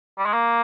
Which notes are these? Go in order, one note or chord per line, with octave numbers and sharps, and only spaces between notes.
G3
G#3
A#3